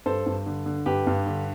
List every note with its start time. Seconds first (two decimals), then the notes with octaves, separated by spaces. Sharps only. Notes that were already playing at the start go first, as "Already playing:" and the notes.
0.06 G2 A4 C5
0.26 G2
0.46 D3
0.66 D3
0.86 G2 G4 B4
1.07 G2
1.26 D3